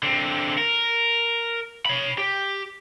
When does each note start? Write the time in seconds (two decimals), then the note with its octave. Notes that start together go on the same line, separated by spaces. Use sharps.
0.03 D3 C4
0.58 A#4
1.86 C#5 B5
2.18 G4